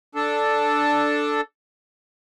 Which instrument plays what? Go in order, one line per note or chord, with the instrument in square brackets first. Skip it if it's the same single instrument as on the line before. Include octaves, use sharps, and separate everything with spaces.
[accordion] D4 A4